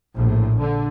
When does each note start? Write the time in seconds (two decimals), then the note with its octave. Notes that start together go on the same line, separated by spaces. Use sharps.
0.15 A#1 A2
0.58 D3